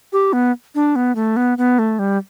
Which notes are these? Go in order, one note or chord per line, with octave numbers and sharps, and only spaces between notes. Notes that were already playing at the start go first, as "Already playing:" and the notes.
G4
B3
D4
B3
A3
B3
B3
A3
G3